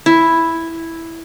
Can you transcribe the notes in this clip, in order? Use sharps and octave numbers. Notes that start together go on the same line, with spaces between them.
E4